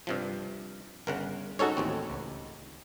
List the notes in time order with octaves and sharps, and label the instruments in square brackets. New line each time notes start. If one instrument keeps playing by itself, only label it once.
[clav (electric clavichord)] G2 C3 F3
[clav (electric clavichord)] G1 C#3 F#5 [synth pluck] A#4
[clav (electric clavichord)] G#2 C#4 D#4 [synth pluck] F#4 A4 C#5
[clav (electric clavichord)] A1 D#2 C4
[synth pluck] C#2